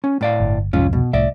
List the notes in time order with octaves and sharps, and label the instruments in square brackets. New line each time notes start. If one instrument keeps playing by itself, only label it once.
[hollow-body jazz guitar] C#4
A2 D5 F5
[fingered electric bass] G1
[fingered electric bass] C2 F2 G#2 [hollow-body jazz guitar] C#4 F4
[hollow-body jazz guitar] B2
[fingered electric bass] C2 A2 [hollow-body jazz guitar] D5 E5